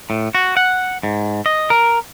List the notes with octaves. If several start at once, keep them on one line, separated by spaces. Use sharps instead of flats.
A2
F#4
F#5
G#2
D#5
A#4